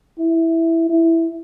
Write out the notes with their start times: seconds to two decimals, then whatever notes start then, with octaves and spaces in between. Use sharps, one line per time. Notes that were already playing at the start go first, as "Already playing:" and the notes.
0.19 E4
0.89 E4